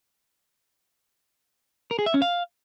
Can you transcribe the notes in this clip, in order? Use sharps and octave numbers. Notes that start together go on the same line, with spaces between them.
A#4
G#4
E5
C#4
F5